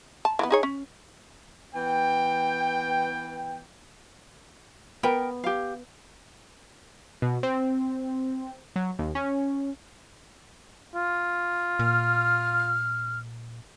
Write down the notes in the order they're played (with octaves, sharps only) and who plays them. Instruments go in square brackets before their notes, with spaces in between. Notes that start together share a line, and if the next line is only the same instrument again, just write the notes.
[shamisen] A5
E3 F3 B3
D#4 G#4 C#5
C#4
[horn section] E3 B3 G5
[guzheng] B3 [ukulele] A#4 G5
[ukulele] G4 F5
[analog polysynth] B2
C4
F#3
D#2
C#4
[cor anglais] F4
[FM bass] A#2 [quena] F6